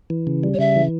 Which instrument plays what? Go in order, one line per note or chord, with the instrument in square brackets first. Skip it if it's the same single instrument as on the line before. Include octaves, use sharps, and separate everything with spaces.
[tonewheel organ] E3
C#3
G3
[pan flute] C#5
[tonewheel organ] C#3 [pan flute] E5
[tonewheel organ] E3